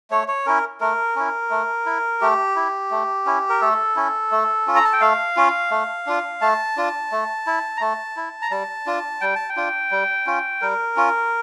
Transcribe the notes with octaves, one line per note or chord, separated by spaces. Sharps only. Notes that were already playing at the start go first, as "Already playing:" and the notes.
A3 C#5
C#5
C#4 E4 A#4
A3 A#4
C#4 E4
A3
E4
A3 G4
E4
A3
C#4 E4
A#4
A3 A4
C#4 E4
A3
C#4 F4
A#5
A5
G5
A3 F5
C#4 F4
A3
D4 F4
A3 A5
D4 F4
A3
E4
A#5
A3 A5
E4
A#5
G3 A5
D4 F4
G3 G5
A5
G5
D4 F4
G3
C#4 F4
G3 A#4
C#4 F4